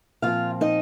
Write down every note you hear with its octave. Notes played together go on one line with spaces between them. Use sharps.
A#2 F3 C4 F4 F5
D#4 D#5